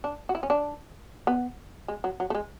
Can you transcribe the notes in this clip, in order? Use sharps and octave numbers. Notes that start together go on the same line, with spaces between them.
D4
F#4
E4
C#4
D4
B3
G#3
F#3
F#3
A3
G#3